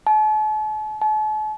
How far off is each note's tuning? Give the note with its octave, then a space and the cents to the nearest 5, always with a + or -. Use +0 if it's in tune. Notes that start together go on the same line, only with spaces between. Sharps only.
A5 -45
A5 -45